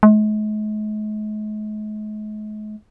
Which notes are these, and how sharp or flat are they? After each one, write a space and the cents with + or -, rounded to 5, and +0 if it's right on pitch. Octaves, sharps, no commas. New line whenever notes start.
G#3 +45